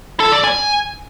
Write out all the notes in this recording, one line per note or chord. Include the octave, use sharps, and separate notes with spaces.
A4
D5
G#5